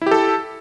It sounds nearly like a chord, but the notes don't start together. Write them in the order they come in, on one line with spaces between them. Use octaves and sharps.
E4 G4 A4